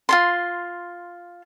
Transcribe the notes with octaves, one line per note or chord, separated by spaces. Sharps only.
F4 A4 C6